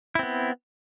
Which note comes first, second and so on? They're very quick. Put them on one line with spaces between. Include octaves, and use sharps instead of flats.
E4 C4 B3